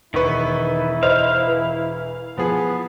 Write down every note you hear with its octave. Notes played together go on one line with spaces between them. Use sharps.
E1 D#3 B3 E4 B4 C#6
C5 D#5 F5 F7
E3
F3 B3 G#4